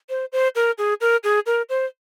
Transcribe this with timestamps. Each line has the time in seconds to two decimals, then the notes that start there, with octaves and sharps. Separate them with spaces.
0.09 C5
0.32 C5
0.55 A#4
0.78 G#4
1.01 A#4
1.24 G#4
1.46 A#4
1.69 C5